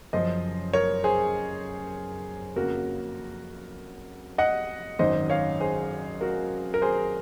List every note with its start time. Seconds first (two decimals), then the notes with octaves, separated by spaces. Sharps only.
0.13 F#1 F#2 F3 C5 D#5
0.73 A#4 C#5
1.04 G#4 C5
2.56 F2 C#3 F3 A#3 F#4 A#4
4.38 D#5 F#5
4.99 G#1 F#2 D#3 C5 D#5
5.30 C#5 F5
5.60 G#4 C5
6.21 F#4 A#4
6.74 A#4
6.82 G#4 C5